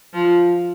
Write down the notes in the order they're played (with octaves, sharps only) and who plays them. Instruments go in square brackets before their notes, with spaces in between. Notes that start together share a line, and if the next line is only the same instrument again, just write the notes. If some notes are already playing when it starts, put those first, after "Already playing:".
[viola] F3